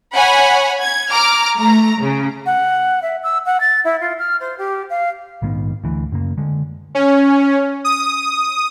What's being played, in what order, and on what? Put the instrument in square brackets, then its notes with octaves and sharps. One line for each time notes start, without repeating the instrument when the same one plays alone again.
[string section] C#5 F#5 G#5 B5
G#6
A#5 D6 F6
A3 A#5
C#3
[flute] F#5
E5
E6
F#5
A6
E4
F4
F6
C5
G4
F5
[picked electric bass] A#1 G#2 D#3 B3
D2 E3
F#2 C#3 A#3
D3 G#3
[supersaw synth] C#4
D#6